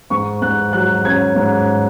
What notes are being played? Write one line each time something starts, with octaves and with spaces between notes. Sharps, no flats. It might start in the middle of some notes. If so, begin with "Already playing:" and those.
G#2 C#6
G#2 F#6
F#3 F#6
C#4 G#6
G#2